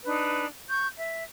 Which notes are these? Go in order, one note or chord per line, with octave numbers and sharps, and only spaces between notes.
D4 D#4 B4
C#6 G6
E5